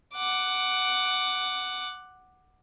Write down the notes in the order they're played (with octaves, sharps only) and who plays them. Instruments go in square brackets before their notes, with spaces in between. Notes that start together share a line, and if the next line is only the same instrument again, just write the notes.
[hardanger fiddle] F#5 D6